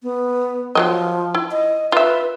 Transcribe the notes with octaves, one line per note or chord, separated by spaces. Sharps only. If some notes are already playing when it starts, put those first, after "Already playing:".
B3
F3 F#3 A#3 D#5
E4
D#5
F4 B4 E5